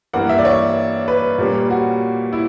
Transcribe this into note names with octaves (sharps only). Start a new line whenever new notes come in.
G2 E3 A#3 F#5
E5
D5
C#5
B4
A#2 G3 A#3 C#4
F#4
E4